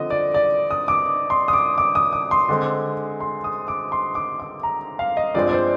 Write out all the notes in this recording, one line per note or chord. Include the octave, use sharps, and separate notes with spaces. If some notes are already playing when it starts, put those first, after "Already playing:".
Already playing: D3 F3 C4 D#5
D5
D5
D#6
D6
C6
D#6
D6
D6
D#6
D6
C6
D3 G#3 C4
C6
D#6
D6
C6
D6
D6
A#5
F5
D#5
G2 F3 G#3 C4 D5
D5
C5